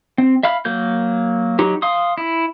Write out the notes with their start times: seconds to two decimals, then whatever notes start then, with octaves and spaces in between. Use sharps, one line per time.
0.18 C4
0.43 E5 F5 B5 F6
0.65 F#3 A#3 G6
1.59 F#3 D#4 G4
1.82 F5 C6 D#6
2.18 E4